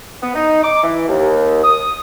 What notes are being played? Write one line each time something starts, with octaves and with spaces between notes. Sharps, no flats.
B3
D#4
D6
E3
D#2
D#6